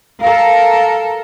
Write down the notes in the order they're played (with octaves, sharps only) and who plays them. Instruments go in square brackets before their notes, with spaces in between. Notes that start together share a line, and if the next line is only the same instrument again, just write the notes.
[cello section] A4 A#4 [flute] F5